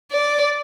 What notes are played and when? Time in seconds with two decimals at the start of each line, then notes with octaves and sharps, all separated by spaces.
0.12 D5